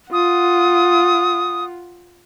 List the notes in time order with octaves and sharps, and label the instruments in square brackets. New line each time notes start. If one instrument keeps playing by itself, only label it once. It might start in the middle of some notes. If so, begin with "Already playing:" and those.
[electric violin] F4 F#5 [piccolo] D#6